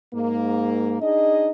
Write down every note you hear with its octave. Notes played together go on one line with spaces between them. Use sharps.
G#2 A#3
D4 D#4 G#4 D#5